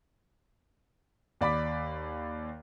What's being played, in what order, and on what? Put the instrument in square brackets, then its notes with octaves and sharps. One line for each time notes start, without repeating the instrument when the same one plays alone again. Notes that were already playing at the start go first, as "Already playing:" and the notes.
[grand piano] D#2 D5 B5 D6 B6